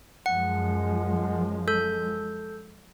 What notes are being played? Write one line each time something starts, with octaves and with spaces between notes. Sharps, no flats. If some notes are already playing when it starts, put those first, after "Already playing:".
F#2 F3 G#3 F#5
A4 G6